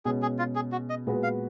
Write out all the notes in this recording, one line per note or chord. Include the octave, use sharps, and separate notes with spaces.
B2 G#3 C#4 G#4
G#4
F4
G#4
F#4
D#5
A#2 G#3 B3 F#4 B4
F5